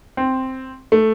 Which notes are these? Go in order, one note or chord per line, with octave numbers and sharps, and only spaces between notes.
C4
A3